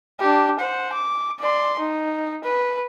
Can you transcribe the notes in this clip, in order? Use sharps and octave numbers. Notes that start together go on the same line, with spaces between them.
D4 G4
C5 F#5
D6
D5 C6
D#4
B4